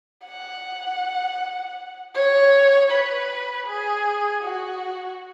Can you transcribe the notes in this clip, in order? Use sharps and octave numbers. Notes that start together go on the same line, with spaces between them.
F#5
C#5
B4
G#4
F#4